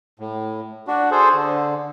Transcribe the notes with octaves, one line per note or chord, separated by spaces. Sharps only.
A2
D4 F#4
G#4 A4 C5
D3